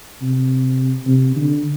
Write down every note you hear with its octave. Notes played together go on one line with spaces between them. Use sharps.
C3
C3
D3